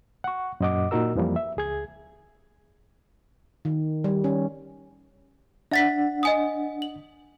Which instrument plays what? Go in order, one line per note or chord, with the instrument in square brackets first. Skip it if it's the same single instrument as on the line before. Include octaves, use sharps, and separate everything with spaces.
[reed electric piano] F#5 C#6
F#2 A#2 D#5 F#5 D6
A#2 D#4 F#4 A#4 E6
F2 E3 F3 G3 A#3
E5
C#2 G#4 G#6
[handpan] D#3
G3
C#4
[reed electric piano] D4 F#5 [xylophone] E5 A6 B6
[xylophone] D#5 G#5 D#6
F#7